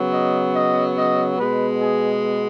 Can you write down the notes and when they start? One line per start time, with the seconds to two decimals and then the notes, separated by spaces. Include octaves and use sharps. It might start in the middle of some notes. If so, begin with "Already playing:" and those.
Already playing: C#3 F#3 B3
0.14 D#5
0.56 D#5
0.97 D#5
1.38 B2 G#3 B3 B4
1.81 G#4